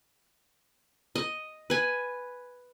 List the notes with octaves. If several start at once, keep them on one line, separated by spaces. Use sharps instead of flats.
D#5
B4 G#5